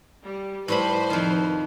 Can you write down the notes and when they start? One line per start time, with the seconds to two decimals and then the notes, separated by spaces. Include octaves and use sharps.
0.23 G3
0.68 A2 G3 B4 C5 B5
1.10 F2 D#3